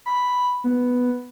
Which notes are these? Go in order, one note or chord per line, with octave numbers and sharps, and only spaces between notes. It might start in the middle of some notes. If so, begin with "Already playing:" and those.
B5
B3